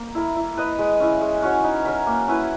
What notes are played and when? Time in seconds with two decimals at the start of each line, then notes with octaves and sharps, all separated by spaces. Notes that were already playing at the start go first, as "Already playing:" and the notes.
Already playing: A#3
0.15 E4 A#4
0.36 E4
0.57 B4 D#5
0.79 G#3
1.00 C#4 E4
1.21 G#3
1.43 C#4 F#4 C#5
1.64 D#4
1.85 A#4 C#5 E5
2.07 A#3
2.28 C#4 E4 B4